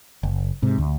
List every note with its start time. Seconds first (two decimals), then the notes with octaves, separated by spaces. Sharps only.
0.23 F#1
0.62 G#2 C3
0.78 D2